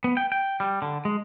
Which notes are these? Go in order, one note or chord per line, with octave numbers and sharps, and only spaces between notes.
B3
G5
G5
G3
D3
G#3